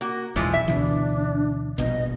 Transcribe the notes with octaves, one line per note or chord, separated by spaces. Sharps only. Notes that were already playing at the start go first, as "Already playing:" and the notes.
A#3 F#4
E1 B1 E3 F3 G#3 E4
E5
D2 B2 E3 D4
D#1 A#1 B2 D#5